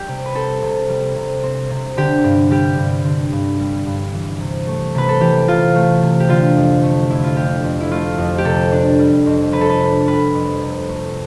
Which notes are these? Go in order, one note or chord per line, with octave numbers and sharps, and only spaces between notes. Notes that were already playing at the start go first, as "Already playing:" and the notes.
Already playing: G3 G4
C3
B4
C4 A4
C3
G3
C3
C4
C3
D3 G4
G2
G3 G4
G2
D3
G2
G3
G2
E3
C3
A3
C3 B4
A4
E3 G4
C3 F4
A3
C3
G4
D3 F4
F2
A3
F2 E4
F4
D3 G4
F2
E4
A3 F4
F2
G4
C3 A4
D4
G3
F2
C3 B4
A4
B4
D4
G3 B4
F2
C3
A3